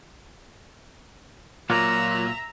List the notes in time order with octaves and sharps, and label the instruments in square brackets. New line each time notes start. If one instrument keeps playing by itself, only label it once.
[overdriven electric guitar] A#2 [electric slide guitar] F#3 A#3 F4 [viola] E5 A#5